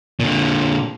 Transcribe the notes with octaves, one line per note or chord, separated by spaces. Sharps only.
A#2 D3